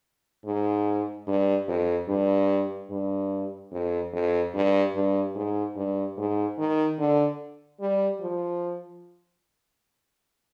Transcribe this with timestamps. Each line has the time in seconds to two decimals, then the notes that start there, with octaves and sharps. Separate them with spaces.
0.45 G#2
1.27 G2
1.68 F2
2.08 G2
2.91 G2
3.71 F2
4.13 F2
4.54 G2
4.95 G2
5.35 G#2
5.76 G2
6.17 G#2
6.58 D#3
6.98 D3
7.80 G3
8.21 F3